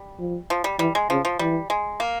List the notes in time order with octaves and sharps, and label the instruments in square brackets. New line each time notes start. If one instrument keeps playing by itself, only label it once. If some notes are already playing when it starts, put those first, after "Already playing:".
Already playing: [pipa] G3
[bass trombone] F3
[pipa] F3
G3
[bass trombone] E3 [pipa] G3
[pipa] G#3
[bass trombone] C#3 [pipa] F3
[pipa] F3
[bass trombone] E3 [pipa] G3
[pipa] G#3
A#3